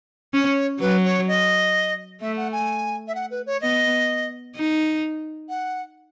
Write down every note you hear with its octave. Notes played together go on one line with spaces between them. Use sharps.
C#4 C#5
F#3 B4
C#5
D#5
A3 E5
F#5
G#5
E5
F#5
B4
C#5
B3 D#5
D#4
F#5